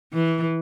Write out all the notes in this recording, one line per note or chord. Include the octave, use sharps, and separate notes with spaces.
E3